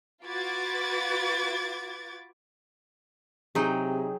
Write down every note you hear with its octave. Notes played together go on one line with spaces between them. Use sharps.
F4 F#4 B4 D6 G#6 A6
C3 F#3 D#4 G#4 G5